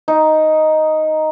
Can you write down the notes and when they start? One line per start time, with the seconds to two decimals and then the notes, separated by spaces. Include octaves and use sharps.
0.08 D#4